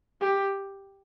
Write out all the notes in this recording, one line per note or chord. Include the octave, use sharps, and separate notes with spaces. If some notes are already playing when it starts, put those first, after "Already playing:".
G4